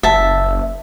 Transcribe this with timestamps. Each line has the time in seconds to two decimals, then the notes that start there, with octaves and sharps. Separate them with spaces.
0.03 F#1 E5 A5